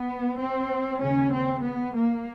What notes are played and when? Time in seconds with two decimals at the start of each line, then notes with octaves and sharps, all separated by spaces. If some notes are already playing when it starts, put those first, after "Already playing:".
Already playing: B3
0.37 C4
0.99 D#2 C#3 C#4
1.31 C4
1.61 B3
1.93 A#3